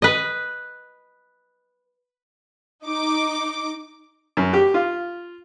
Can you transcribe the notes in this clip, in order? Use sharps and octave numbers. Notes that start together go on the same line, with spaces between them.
B4 D#5
D#4 D6
F#2
G4
F4